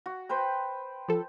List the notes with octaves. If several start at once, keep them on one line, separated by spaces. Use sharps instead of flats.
F#4
B4 C5 G5
F3 A4